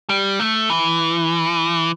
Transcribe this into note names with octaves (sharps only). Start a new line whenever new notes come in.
G3
A3
E3